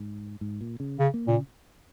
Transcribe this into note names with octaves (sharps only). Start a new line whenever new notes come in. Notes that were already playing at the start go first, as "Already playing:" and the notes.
Already playing: G#2
G#2
A#2
C#3
C#3
A#3
A#2 C#3